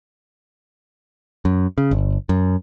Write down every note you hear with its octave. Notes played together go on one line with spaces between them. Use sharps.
F#2
C#3
G1
F#2